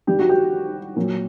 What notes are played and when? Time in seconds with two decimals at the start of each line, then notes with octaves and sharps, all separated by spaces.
0.07 G2 D#3 G3 G4
0.19 F#4
0.29 G4
0.96 A#2 F#3